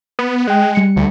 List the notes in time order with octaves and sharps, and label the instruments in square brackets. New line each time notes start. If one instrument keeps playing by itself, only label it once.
[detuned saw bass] B3
[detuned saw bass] G#3 [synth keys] G5 F#6
[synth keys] G3 C#7
[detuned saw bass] D2